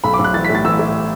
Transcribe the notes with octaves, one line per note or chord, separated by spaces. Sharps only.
B1 B5
D6
B1
F#6
E3 A6
B6
A2
A6
E3 E6
A2